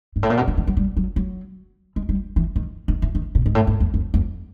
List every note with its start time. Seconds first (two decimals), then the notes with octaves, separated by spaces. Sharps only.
0.16 G#2
0.23 A2
0.30 A#2
0.37 B2
0.48 D#3
0.57 E3
0.67 F#3
0.77 G3
0.97 F#3
1.16 F#3
1.96 G#3
2.09 G3
2.36 E3
2.56 D#3
2.88 D#3
3.02 E3
3.15 D#3
3.35 B2
3.46 G#2
3.55 A2
3.67 G#2
3.80 E2
3.94 F2
4.14 F2